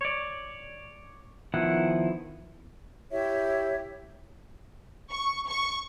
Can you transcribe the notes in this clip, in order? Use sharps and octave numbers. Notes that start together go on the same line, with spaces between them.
C#5 D5
D#3 F3 B3 E4 F#5
E4 G4 C#5 E5
C#6
C#6